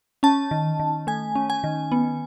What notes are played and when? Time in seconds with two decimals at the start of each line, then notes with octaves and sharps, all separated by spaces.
0.23 C#4 A5
0.51 D#3
0.80 D#3
1.07 A3 G#5
1.35 C#4
1.50 G#5
1.64 D#3
1.92 B3